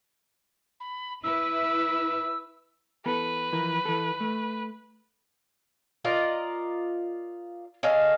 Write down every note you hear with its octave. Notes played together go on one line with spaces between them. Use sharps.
B5
E4 B4 E6
E3 B3 A4 B4
E3 F3 A#4
E3 A4
A3
F4 A#4 D5 D#5
C#4 A4 D#5 F5